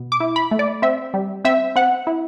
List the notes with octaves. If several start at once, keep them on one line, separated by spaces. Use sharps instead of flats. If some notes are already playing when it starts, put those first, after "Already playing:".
Already playing: B2
D6
E4
B5
A3
D5
C4 E5
G3
C4 E5
C4 F#5
E4